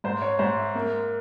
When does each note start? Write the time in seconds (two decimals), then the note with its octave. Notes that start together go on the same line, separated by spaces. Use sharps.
0.04 G#2 C5
0.22 C#5
0.39 G#2 C5
0.57 E5
0.75 A#3